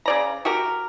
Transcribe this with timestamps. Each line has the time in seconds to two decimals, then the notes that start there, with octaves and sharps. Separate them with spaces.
0.06 C#3 D5 A#5
0.45 F#4 G4 A#4